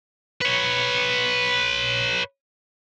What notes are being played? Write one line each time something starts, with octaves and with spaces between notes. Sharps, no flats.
B4 C#5